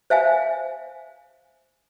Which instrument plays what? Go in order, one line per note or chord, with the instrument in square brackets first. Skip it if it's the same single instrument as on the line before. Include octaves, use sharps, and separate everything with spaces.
[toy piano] C5 E5 F5 G#5